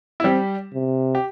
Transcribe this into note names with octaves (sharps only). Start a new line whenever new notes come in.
E4
G3 C4 G4
C3
G4